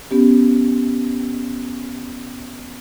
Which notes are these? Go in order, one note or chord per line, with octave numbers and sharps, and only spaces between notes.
B3 C#4 G4